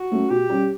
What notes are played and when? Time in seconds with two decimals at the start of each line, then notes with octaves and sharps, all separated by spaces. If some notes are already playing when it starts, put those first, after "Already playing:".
Already playing: F#4
0.11 F#3 A3 C#4
0.30 B2 G4
0.49 G3 C#4